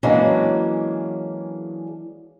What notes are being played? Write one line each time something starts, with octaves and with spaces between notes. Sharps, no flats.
E3 F#3 G#3 A#3 C#4 D4